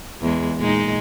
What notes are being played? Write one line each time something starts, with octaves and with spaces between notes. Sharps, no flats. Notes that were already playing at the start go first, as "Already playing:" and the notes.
E2 G#3
A#2 G#3 D#4